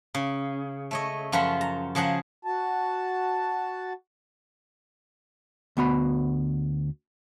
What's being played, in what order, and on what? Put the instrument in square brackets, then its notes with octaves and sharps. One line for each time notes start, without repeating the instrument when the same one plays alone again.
[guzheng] C#3
A3 C#5 D#5
F#2 F3 F4 F#5 B5
A#5
C#3 F3 G#4 F#5 A#5
[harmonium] F#4 A5
[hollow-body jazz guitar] D2 B3 F#4 B5